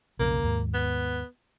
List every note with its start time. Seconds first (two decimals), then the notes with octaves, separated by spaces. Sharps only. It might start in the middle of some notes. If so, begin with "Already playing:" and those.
0.19 B1 F2 C#3 A#3
0.43 D#2 G#2
0.74 B3